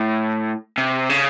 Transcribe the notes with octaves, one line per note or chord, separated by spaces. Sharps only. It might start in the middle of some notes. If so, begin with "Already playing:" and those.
Already playing: A2
C3
C#3